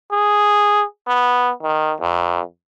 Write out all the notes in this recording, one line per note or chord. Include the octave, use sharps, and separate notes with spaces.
G#4
B3
D#3
F2